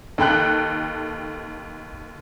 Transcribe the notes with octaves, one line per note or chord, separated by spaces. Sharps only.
D#2 A4 G5 F#6